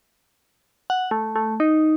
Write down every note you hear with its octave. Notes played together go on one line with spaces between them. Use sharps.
F#5
A3
A3
D#4